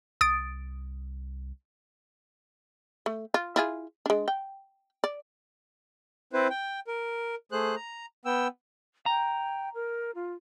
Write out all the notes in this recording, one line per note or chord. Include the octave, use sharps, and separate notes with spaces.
C2 D#6 A6 D7
A3
F4
E4 F4 G#4
G#3 D4
G5
D5
C4 E4 B4 C5
G5
A#4
A3 G#4 C5 F#6
A#5
B3 G5 E6
G5 A#5
A#4
F4